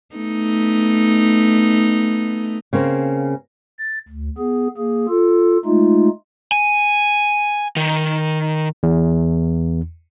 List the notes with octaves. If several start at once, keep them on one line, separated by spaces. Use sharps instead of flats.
A3 B3 D#4
C#3 A#3 C4
A6
D2
B3 G#4
A#3 G#4
F4 A4
G#3 A3 D#4 F4
G#5
D#3
E2